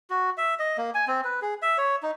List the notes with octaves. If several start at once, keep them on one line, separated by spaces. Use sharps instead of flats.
F#4
E5
D#5
A#3
G#5
C4
B4
G#4
E5
C#5
D#4